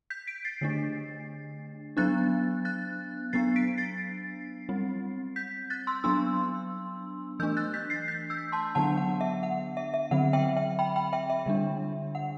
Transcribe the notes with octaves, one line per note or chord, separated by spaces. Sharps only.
G6 B6
B6 D7
A6 C7
D3 A3 D4
F#3 B3 D4 F#6 A6
F#6 A6
F#3 B3 D4 A6 C7
B6 D7
A6 C7
G3 C4
G6 B6
F#6 A6
C6 E6
F#3 B3 D4 C6 E6
E3 A3 D4 E6 G6
F#6 A6
G6 B6
A6 C7
G6 B6
E6 G6
A5 C6
D3 F#3 B3 D4 F#5 A5
F#5
E5
F#5
E5
E5
D3 F#3 C4 F#5
E5 G5
E5 G5
G5 B5
G5 B5
E5 G5
E5
D3 G3 D4
F#5